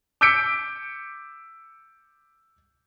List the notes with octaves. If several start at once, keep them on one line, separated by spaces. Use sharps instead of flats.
D6 E6 G6 B6 C#7 D7